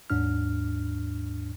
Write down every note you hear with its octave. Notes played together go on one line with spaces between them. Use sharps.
D#2 G#2 D4 F6